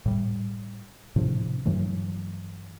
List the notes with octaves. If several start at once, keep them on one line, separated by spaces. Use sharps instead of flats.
A2 G3
A2 C3 F3 D4
G2 E3 F#3 A3